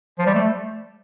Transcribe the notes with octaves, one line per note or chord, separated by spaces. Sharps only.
F3
G3
A3